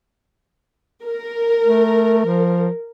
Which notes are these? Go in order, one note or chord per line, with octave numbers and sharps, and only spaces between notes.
A#4
A3
F3